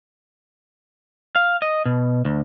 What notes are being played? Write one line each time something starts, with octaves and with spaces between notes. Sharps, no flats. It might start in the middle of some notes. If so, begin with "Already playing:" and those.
F5
D#5
B2
D2